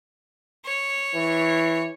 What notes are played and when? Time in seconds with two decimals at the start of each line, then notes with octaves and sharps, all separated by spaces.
0.66 C#5
1.15 E3